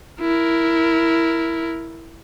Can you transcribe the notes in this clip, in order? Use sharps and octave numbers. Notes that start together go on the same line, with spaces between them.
E4 A#4